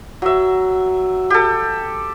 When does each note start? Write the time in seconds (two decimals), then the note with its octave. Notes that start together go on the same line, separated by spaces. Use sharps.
0.22 F#3 E5
1.30 G4 A4